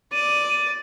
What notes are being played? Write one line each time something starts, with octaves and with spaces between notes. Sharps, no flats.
D5 D#7